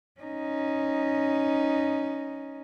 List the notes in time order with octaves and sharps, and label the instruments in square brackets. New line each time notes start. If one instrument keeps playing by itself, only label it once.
[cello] C#4 D#4